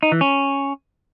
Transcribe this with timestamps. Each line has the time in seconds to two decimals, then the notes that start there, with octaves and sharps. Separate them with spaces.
0.03 D#4
0.12 E3
0.21 C#4